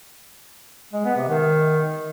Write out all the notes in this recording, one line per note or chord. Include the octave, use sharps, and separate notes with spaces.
G#3
B3
C3
D#3